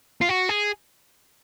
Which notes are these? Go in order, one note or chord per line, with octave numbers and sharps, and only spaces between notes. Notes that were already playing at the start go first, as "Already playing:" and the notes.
F4
F#4
G#4